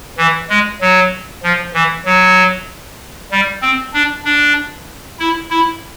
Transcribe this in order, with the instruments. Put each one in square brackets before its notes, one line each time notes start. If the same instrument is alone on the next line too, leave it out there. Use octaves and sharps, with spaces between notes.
[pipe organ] E3
G#3
F#3
F3
E3
F#3
G3
C4
D4
D4
E4
E4